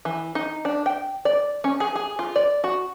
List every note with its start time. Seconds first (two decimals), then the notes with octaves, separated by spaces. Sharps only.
0.05 E3
0.35 D#4
0.65 D4
0.86 G5
1.25 D5
1.64 C#4
1.80 G#4
1.96 G#4
2.19 F4
2.36 D5
2.64 F#4